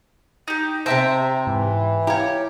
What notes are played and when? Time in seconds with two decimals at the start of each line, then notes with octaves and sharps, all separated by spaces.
0.48 D#4 G4
0.86 C3 C5 E5 G5 A5 A#5 E6
1.47 G#2 E3
2.07 E4 G4 C#5 F5 G5 A#5